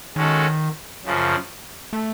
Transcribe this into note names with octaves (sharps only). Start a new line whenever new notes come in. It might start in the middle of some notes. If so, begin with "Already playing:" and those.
D#3 G#3 C#4 F#4 A4
F#2 C#3 F3
A3